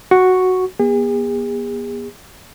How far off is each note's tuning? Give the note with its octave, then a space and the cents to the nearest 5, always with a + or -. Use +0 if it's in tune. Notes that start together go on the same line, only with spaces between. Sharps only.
F#4 +0 C#6 +0
B3 -45 G#4 -40